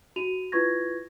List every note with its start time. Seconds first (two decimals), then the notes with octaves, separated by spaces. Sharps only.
0.16 F#4 D#7 F7
0.52 E4 F4 B4 C#6 G#6 A#6